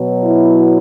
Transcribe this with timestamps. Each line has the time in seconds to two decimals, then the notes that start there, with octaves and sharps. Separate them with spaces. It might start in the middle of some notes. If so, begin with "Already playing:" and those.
Already playing: B2 F#3
0.24 E4